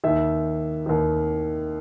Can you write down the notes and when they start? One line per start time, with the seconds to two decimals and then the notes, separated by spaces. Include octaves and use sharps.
0.04 D#2 D#3 E5
0.86 D#2 D#3